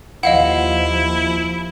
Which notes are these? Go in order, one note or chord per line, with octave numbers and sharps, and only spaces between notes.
D#2 F3 E4 D#5 F5 F#5